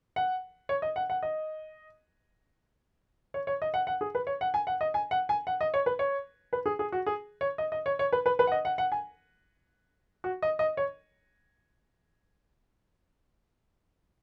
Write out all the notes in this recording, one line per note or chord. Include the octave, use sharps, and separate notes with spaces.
F#5
C#5
D#5
F#5
F#5
D#5
C#5
C#5
D#5
F#5
F#5
G#4
B4
C#5
F#5
G#5
F#5
D#5
G#5
F#5
G#5
F#5
D#5
C#5
B4
C#5
B4
G#4
G#4
F#4
G#4
C#5
D#5
D#5
C#5
C#5
B4
B4
B4
F#5
D#5
F#5
F#5
G#5
F#4
D#5
D#5
C#5